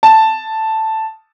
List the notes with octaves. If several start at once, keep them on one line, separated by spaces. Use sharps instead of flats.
A5